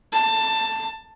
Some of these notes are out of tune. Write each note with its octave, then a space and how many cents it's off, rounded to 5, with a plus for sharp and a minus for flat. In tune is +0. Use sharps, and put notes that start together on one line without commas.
A5 +15